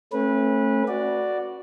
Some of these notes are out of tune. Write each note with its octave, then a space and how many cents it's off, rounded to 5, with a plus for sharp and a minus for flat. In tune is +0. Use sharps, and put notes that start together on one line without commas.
A3 +0 C#4 -40 B4 -20
F#4 +0 D5 +0